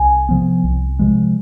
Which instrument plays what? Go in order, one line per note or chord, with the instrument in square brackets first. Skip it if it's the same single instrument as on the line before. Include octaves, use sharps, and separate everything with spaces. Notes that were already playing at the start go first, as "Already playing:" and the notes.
Already playing: [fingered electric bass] C2 [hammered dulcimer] G#5
[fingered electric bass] C3 F3 B3
C2
C3 F3 G#3